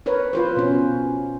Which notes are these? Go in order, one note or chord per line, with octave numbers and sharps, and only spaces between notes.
A#4 B4 C#5
F4 B4 C5
B2 C#4